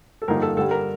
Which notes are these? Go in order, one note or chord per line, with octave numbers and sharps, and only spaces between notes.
A4
G2 D3 F3 A#3 D#4 A#4
A4
G2 D3 G3 A4
A#4